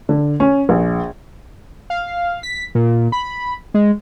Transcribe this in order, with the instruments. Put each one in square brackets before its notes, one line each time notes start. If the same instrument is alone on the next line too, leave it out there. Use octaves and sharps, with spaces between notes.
[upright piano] D3
C#4
A#1
[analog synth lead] F5
B6
A#2
B5
G#3